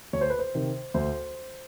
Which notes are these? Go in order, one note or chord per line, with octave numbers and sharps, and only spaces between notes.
D2 C#5
C5
B4
C5
C3 D#3
D2 C5